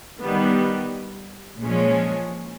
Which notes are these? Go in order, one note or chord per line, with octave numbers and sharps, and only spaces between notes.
D#3 G3 B3
A#2 F3 G#3 C#4